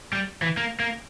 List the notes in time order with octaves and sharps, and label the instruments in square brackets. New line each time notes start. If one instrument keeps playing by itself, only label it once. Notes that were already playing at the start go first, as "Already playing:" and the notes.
[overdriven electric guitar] G3
E3
A#3
A#3